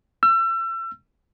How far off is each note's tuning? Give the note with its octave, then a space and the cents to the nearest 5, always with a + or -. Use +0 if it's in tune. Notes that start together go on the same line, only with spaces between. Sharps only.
E6 +35